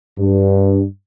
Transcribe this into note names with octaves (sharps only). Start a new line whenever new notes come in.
G2